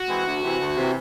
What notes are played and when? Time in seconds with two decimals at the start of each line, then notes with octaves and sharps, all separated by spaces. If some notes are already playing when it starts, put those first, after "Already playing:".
Already playing: F#4
0.09 E3 G#3 C4
0.26 D2
0.42 C3 E3
0.60 D2
0.77 C3 E3